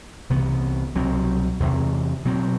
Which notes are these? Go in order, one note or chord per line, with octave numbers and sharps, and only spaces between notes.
C2 C3 E3 B3
C2 B2 F#3 C4
E2 C3 E3
B2 F#3 C4